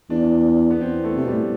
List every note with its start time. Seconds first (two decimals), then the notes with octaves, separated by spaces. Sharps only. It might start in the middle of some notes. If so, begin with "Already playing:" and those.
0.10 E2 D4
0.71 B3
0.80 E2 C4
1.04 A3
1.16 C3
1.25 B2 G3
1.33 A2